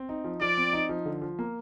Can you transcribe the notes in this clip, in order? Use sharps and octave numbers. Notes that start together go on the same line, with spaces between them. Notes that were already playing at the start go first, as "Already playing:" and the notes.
Already playing: C4
D#4
F3
F3 D5
C4
D#4
F3
D3
F3
A#3